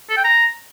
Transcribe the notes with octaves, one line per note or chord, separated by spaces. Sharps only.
A4
G5
A#5